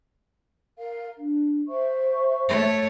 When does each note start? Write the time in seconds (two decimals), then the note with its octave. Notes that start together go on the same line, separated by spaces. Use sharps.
0.78 A#4 F5
1.16 D4
1.68 C5 E5 C#6
2.49 A3 C#5